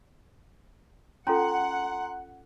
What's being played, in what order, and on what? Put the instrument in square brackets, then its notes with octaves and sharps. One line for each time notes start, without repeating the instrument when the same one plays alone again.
[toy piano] C#4 F4 A4 [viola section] F#5 [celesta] G#5 A#5 C6